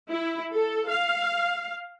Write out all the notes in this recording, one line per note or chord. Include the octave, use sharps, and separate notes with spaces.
E4
A4
F5